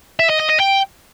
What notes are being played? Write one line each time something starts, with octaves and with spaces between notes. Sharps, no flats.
E5
D#5
D#5
D#5
G5